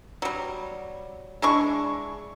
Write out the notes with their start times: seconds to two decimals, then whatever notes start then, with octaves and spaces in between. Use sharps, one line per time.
0.22 F#3 G3
1.42 G#3 D4 E4 C#6